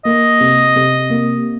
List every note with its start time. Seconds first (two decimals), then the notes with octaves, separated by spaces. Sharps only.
0.05 A#3 D#5
0.40 C3
0.76 C3
1.10 A#3